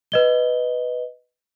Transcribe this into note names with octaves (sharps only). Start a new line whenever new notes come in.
B4 D#5 G7